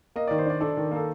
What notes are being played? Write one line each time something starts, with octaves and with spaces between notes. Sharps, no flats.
A#3 D#5
D#3 D5
C5
D4 D5
D4 A4
D#3
A#3 A4